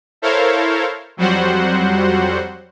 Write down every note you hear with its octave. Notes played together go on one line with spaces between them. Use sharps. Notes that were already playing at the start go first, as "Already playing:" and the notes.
E4 A4 A#4 C5 C#5 F5
F2 F#3 G3 F#4 C5 F#5